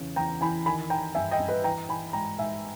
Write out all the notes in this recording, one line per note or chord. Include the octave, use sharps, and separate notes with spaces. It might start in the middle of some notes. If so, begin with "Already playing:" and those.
Already playing: E2 C#3
E2 G5 A#5
E3 G#5 B5
D#3 G#5 B5
D#3 G5 A#5
G2 E5 G#5
D#5 G5
G2
B4 D#5
E3 G5 A#5
E3 G#5 B5
G#2 G5 A#5
G#2 E5 G#5